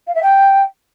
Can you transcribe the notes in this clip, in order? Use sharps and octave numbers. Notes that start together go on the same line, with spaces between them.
F5
E5
G5